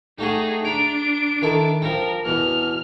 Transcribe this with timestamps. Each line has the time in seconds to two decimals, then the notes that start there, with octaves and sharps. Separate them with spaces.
0.19 G3 A3 D#4 F#4 G#4
0.65 D4 A#5 B5 D7
1.42 D#3 E4 A4
1.82 F3 G3 A#4
2.25 E2 B2 F6